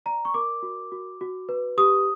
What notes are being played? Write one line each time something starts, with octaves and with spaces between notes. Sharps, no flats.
D5 A#5
C#6
A#4 D6
F#4
F#4
F#4
B4
G4 D#6